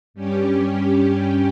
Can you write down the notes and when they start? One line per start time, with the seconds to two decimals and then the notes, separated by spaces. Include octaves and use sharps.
0.14 G2 G3 C#4 G4